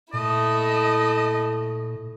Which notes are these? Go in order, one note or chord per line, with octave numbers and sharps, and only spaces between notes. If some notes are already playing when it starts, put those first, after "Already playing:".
A#2 A3 E4 D#5